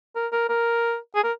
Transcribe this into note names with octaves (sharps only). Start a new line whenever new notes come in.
A#4
A#4
A#4
G#4
A#4